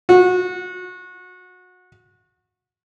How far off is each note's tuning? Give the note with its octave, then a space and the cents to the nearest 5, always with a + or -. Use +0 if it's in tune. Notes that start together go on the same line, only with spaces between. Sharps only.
F#4 -25